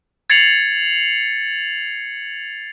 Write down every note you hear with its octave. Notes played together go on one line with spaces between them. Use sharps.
G#6 A6 C7 C#7 F7 F#7